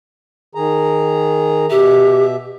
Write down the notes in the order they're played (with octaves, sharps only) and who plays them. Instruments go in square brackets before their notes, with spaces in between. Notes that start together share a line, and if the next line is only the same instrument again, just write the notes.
[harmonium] D#3 G#4 A#5
[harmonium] B2 E5 [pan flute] G4